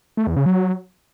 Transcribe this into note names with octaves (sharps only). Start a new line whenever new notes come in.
A3
E2
C#3
F#3